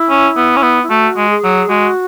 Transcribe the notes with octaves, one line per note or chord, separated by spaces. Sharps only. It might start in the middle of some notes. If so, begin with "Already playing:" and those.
Already playing: E4
C#4
B3
C#4
B3
E4
A3 F#4
G#3
G#4
F#3
G#3 F#4